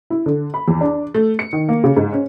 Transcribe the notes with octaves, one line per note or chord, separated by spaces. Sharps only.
E4
D3
B5
E2
D4
A3
C#7
D#3
A#3
C#3
G#2
C#4